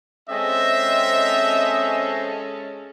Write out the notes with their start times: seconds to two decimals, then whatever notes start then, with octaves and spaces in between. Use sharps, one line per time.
0.30 G#3 C4 C#4 A4 C5 D#5 E5